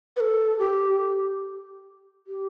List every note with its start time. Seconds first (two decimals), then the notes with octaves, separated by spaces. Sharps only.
0.17 B4
0.20 A4
0.59 G4
2.27 G4